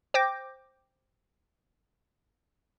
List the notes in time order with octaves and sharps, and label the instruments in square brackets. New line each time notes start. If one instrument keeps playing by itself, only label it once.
[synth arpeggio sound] C5 G5 D6 G6 A#6